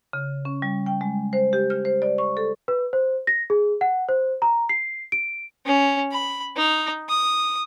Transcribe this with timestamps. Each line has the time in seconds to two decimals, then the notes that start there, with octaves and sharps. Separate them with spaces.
0.13 C#3
0.45 C#4
0.62 G3
0.86 G5
1.01 G#3
1.33 C5
1.53 G4
1.70 F6
1.85 C5
2.02 D5
2.18 C#6
2.37 A4
2.68 B4
2.93 C5
3.27 A#6
3.50 G#4
3.81 F#5
4.09 C5
4.42 A#5
4.69 C7
5.12 D7
5.66 C#4
6.12 B5
6.56 D#4
7.09 D#6